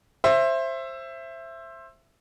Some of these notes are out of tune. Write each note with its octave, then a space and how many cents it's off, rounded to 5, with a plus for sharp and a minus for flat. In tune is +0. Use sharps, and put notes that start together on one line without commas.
C5 +20 E5 +15